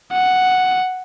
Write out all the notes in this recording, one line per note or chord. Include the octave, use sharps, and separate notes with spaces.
F#5